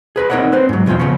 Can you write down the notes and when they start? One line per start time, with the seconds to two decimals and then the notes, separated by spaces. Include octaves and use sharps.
0.16 G#4 B4 B5
0.30 C4 D#4 A#4 C#5 D5 F#5
0.52 C4 B4 C5
0.69 G#2 F#3
0.86 E2 B2 G3 F4 G5
0.99 C#3 F3 B3 C#4